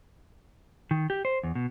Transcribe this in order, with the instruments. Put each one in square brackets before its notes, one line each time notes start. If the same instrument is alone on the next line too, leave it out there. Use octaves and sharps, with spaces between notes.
[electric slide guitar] D#3
G4
C5
E2
B2